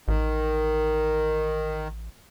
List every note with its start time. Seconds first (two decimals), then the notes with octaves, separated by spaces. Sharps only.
0.08 A1 D#3